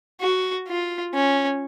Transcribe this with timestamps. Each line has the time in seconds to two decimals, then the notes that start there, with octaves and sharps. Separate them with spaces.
0.21 F#4
0.68 F4
1.14 C#4